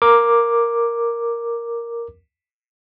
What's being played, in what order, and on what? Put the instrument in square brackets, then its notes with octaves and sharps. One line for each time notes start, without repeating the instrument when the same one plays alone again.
[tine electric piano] A#4 D6